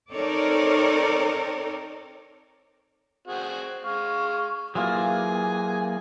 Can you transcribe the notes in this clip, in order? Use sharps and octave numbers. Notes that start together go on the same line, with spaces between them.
C4 D#4 A4 A#4 C#5 D5
C4 F#4 G#4
G#3 F5 C#6
E3 F#3 A#3 F4 G4 G#4 G#5